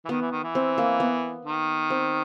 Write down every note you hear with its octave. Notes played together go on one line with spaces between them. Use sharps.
E3
D#3 B3
E3
D#3
E3
C4
A#3
B3
D#3
C4